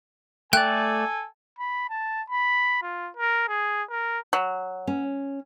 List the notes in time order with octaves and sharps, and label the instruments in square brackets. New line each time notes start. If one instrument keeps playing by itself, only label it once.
[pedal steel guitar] A3 D5 [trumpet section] A4 G#5 [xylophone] G5 F#6
[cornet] B5
A5
B5
F4
A#4
G#4
A#4
[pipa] F#3
[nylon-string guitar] C#4